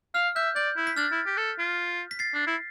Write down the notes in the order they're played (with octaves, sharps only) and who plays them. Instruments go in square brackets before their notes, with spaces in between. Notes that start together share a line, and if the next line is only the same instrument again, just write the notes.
[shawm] F5 [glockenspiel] F6
[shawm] E5 [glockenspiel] G6
[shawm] D5 [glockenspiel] G6
[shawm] E4
[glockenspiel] B6
[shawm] D4 [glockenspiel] F6 A6
[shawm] E4
G4
A4
F4
[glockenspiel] B6
A6 C7
[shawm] D4
E4